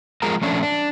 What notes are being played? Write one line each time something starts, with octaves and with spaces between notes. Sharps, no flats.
F3 G#3 A#4 A#5
F3 A3 C#4 D4
D4